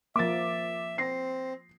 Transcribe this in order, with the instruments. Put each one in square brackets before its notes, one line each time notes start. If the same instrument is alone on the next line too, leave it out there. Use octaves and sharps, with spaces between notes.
[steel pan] F3 A#3 [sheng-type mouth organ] E5 [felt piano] D6 A6
[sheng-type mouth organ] C4 [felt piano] A#6 C7